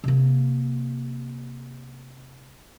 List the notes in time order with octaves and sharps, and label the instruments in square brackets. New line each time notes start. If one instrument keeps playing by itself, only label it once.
[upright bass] C3 A#3